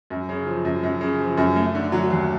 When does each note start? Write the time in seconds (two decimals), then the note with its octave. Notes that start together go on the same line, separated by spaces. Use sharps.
0.10 F#2
0.29 C#3
0.46 F3
0.65 F#2
0.83 F#2
1.01 C#3
1.20 F3
1.37 F#2
1.56 A3
1.75 D3
1.92 F#3
2.10 D#2